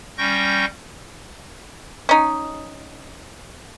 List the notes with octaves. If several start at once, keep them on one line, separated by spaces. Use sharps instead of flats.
G3 C#4 G5 C#6 G6 A#6
C#4 D#4